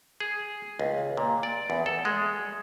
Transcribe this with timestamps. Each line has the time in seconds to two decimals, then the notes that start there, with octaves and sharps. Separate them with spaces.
0.20 G#4
0.79 C#2
1.17 A#2
1.43 D5
1.70 E2
1.86 A4
2.05 G#3